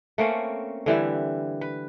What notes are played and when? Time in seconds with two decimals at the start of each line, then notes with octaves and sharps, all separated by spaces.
0.18 A3 A#3 C4 C#4
0.86 D3 E3 G3 E4
1.61 B4